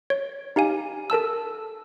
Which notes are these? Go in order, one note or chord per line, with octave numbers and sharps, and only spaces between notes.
C#5
D#4 G4 F5 G#5
A4 A#4 A5 E6